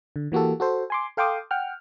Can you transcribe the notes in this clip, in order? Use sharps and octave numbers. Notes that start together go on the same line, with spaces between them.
D3
E3 A#3 F#4 G4 A4
F#4 A4 C5
G#5 C6 D6
A4 F5 G5 C6 D6 D#6
F#5 G5 F6